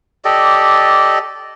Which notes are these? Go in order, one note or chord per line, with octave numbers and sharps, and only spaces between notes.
G4 A4 D5 D#5